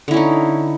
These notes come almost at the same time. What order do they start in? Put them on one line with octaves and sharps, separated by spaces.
D3 E4 C#4 D#4